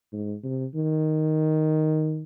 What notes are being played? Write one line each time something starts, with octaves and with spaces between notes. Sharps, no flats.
G#2
C3
D#3